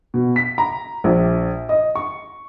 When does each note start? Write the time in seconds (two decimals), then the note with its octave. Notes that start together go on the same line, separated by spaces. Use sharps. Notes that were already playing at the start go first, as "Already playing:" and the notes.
0.14 B2
0.36 B6
0.58 A#5
1.04 A#1
1.69 D#5
1.95 C#6